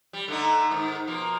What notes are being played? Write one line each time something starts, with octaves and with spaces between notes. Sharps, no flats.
G3
D3 A3 D#4
G#2 D#3
B2 F3 A#3